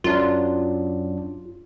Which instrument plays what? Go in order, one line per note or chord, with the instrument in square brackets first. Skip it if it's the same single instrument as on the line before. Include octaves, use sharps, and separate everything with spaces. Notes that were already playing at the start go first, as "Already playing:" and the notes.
[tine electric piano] F#2 F#3 D4 [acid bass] F4